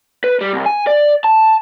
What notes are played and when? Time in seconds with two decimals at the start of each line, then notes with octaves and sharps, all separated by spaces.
0.24 B4
0.41 G3
0.53 C2
0.66 G#5
0.87 D5
1.24 A5